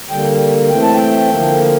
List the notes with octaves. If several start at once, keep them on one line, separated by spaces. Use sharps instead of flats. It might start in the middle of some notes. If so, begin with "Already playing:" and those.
D3 G3 A#3 G5
E3 A3 C4 G5
A5
G5
D3 F3 A#3